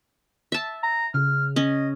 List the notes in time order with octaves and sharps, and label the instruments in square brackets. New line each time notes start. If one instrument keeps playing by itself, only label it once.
[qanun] E5 A5
[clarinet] A#5
[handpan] C#3 [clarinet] F6
[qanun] C#4 [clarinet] D#5